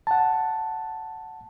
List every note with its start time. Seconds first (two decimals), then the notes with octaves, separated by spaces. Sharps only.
0.07 F#5 A5